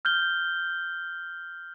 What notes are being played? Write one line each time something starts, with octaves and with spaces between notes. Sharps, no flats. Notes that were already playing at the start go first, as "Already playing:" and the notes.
F6 G6 G7